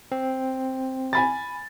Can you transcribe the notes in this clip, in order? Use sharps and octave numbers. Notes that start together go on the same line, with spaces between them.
C4
G#5 B5 A6